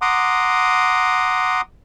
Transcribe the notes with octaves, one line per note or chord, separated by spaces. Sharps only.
F#5 A#5 C6 D6 D#6